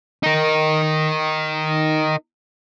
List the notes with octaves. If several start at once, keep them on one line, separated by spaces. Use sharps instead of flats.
D#4 A#4